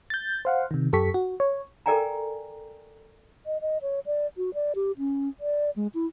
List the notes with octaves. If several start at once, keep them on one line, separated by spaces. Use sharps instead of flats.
G6 A6
C5 F5 F#5
C3 D#3
F#2 G4 A4 C#6 B6
F#4
C#5
A4 A#4 D5 G5 G#5 A#5
D#5
D#5
C#5
D5
F#4
D5
G4
C#4
D5
G#3
E4